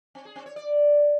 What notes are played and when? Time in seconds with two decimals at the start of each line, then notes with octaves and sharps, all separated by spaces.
0.15 C4
0.25 G#4
0.36 C4
0.46 C#5
0.56 D5